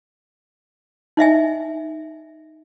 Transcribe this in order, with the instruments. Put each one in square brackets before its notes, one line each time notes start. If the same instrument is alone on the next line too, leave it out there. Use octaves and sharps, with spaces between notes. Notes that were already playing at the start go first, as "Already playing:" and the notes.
[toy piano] D#4 D#5 E5 G#5